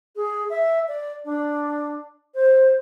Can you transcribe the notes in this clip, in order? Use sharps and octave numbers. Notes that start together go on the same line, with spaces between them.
G#4
E5
D5
D4
C5